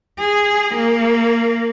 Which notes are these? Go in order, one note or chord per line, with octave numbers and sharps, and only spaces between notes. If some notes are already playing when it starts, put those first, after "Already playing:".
G#4
A#3